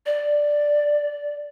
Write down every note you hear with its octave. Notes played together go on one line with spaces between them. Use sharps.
D5